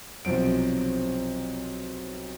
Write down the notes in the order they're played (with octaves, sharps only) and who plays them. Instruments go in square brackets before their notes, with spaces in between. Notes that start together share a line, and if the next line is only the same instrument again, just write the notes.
[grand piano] B1 C3 F3 F#3 D7